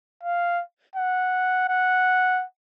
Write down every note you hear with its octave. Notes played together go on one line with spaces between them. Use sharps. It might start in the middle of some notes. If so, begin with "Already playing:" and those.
F5
F#5
F#5